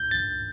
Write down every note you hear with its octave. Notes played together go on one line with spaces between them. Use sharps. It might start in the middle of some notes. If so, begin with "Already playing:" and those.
Already playing: G6
A6